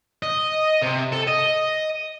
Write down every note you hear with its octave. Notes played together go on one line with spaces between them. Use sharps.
D#5
C3
A4
D#5